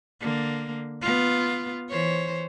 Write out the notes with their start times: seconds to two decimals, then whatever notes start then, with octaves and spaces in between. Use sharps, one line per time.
0.20 D3 A#3
1.02 B3 F4
1.90 E3 C5 C#5